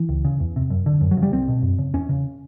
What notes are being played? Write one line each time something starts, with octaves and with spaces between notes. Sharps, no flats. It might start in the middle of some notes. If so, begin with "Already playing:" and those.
Already playing: E3
C#2
C#3
E2
C3
F#2
D3
F#2
F#3
C#3
G3
C2 C4
B2
F#2
C#3
E2 C#4
C#3